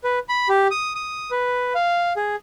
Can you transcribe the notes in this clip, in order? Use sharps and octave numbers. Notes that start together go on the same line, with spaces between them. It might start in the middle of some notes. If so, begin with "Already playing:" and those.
B4
B5
G4
D#6
D#6
B4
F5
G#4